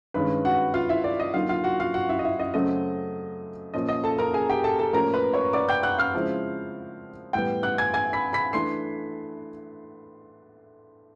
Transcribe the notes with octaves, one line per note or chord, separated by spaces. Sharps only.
G2 D#3 G#3 C#4 B4 B5
F#4 F#5
F4 F5
E4 E5
D5
D#5
D3 F#3 A#3 D#4 F4 F5
F4 F5
F#4 F#5
F4 F5
F#4 F#5
E4 E5
D#5
E4 E5
D#5
F#2 C#3 F#3 A3 C4 D#5
A#2 F3 A#3 C#4 D#5
D#5
A4 A5
A#4 A#5
G#4 G#5
G4 G5
A4 A5
A4 A5
A2 F3 A#3 C#4 A#4 A#5
B4 B5
C#5 C#6
D5 D6
G5 G6
F#5 F#6
F5 F6
C#3 F3 G#3 C4 E4
A2 E3 G3 B3 G5 G6
F#5 F#6
G#5 G#6
G#5 G#6
B5 B6
B5 B6
E3 A3 D4 C6 C7